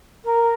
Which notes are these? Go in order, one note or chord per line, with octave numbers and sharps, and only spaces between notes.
A#4